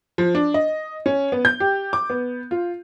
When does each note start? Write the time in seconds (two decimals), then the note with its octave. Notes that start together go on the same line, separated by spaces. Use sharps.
0.18 F3
0.35 D4
0.54 D#5
1.06 C#4
1.32 B3
1.45 G6
1.60 G4
1.93 D6
2.10 B3
2.51 F4